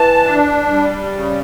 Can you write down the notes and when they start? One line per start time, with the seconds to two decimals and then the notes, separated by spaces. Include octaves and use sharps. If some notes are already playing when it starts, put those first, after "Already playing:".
Already playing: E3 A5
0.25 D4
0.70 G3
1.16 C#3